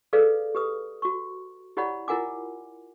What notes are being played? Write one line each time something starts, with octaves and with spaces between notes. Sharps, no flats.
G#4 A4 B4 D5 F5
G4 B4 D#6
F#4 C#6
E4 G4 C#5 D5 F#5 B5
E4 F4 A#4 F#5 G#5 D6